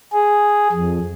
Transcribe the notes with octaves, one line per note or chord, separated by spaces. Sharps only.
G#4
F2